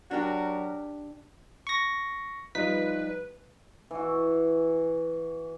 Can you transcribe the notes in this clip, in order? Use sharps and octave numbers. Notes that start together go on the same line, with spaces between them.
F#3 D4 F#4 G4 A#4
C#6 A#6
F3 G3 D#4 F4 B4 B6
E3 F#4